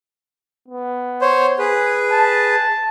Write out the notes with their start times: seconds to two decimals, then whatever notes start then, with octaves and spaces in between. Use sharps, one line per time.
0.68 B3
1.21 C5 C#5 C6
1.59 G#4 B4
2.13 A5